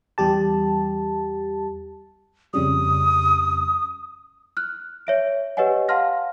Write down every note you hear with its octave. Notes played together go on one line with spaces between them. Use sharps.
E2 G3 G4 A5
F2 C#3 G3 D#6
F6 F#6
C#5 E5 D7
G4 B4 C#5 D#5 F#5 G#5
F5 F#5 A5 C6 F6 A#6